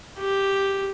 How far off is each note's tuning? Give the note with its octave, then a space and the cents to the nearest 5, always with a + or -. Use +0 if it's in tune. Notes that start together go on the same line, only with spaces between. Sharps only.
G4 +0